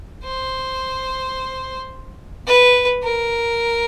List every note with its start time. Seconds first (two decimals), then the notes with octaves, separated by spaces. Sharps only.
0.24 C5
2.47 B4
3.03 A#4